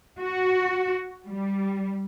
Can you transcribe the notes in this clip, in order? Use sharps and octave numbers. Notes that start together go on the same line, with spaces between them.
F#4
G3